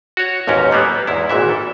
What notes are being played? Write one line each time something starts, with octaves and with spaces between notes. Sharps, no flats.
F#4 C#5
A1 D#2 G#2 C#4 A#4
F#3 G3 A#3 B3
E2 G#2 E4
G#1 A#2 E3 E5
A4